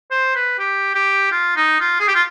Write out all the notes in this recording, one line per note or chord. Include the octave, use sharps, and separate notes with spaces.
C5
B4
G4
G4
F4
D#4
F4
G#4
G4
F4